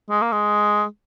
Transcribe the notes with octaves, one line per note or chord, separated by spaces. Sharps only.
G#3
A#3
G#3